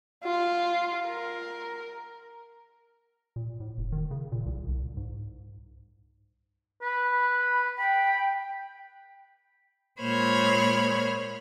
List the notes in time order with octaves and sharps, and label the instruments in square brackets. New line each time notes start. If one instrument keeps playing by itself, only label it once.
[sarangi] F4
A#4
[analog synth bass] A#2
A2
F1
D#3
C#3
A#2
C2
C2
G#2
[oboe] B4 [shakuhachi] B5
[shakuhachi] G5 [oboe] B5
[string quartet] A#2 G#3 C5 C#5 B5 F6